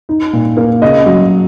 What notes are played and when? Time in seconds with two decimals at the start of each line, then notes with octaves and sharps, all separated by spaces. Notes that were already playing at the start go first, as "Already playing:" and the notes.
0.09 D#4
0.33 A#2
0.57 A#3
0.82 C#3 D#5
1.06 F#3